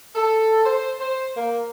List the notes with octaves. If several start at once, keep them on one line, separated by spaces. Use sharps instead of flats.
A4
C5
C5
A#3